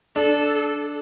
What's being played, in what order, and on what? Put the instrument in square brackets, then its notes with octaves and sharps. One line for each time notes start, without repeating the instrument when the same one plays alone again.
[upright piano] D4 [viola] A4